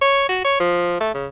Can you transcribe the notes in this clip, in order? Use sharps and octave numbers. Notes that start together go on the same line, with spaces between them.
C#5
F#4
C#5
F3
A3
C#3